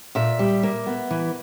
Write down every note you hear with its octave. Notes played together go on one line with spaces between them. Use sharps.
A#2 E5
G3
A#3
B3
E3